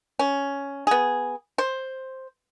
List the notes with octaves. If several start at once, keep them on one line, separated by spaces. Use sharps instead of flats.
C#4
B3 G#4
C5